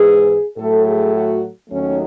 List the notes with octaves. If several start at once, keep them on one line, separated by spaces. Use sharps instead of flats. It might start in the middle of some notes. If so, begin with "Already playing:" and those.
Already playing: G#2 E3 G#3 G#4
A2 F#3 A3 A4
G#4
F#4
D#2 D#3 F#3 A3 C#4